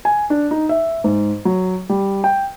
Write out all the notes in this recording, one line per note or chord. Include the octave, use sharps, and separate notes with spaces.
G#5
D4
D#4
E5
G#2
F#3
G3
G5